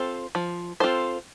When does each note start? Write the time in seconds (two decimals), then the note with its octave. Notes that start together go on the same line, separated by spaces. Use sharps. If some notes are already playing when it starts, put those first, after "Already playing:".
Already playing: C4 F4 A4 C5
0.35 F3
0.80 C4 F4 A4 C5